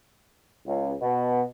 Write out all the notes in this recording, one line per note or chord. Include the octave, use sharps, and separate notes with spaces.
C#2
B2